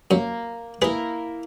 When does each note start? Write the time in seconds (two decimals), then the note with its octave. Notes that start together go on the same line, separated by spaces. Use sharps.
0.11 F#2 A#3
0.82 A#3 E4 G#4 A#4 B4